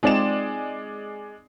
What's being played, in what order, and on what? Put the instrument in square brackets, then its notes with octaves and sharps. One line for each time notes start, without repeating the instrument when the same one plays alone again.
[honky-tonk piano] G#3 D5 E7 [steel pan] C4 D#4 F4